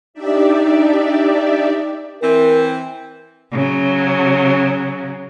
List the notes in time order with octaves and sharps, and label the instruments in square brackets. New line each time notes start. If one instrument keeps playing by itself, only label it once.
[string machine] D4 D#4 G4 D5 E5
[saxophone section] E3 C4 [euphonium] A#4
[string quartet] C#3 F#3